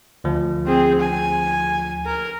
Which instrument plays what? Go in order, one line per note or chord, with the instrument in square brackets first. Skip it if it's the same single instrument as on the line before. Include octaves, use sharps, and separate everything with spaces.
[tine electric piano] D2 F3
[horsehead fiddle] C4 G#4
G#5
A#4